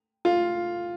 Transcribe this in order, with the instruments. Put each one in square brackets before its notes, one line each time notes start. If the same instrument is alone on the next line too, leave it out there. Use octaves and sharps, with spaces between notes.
[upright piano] F4